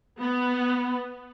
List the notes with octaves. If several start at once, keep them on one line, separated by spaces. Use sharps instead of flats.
B3